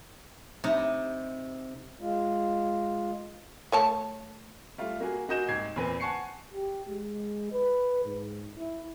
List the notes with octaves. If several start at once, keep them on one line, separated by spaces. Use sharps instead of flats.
C3 D#4
G#3 F4
A3 C#5 A5
G3 A3 F4
A#3 F#4 G#4
A#3 F#4 G#4 D#5 G6 E7
C2 G#2 G#6 C7
E2 A#2 C4 B4 G#5 D#7
F#5 G#5 A5 C#6 C7 C#7
G4
G#3
B4
G#2
E4